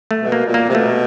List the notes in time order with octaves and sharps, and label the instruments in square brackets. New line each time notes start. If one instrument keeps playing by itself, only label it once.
[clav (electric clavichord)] A3
[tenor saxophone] B2
[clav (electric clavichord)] A#3
[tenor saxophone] A#2
[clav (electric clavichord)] A#3
[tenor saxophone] C3
[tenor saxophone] B2 [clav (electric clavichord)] A3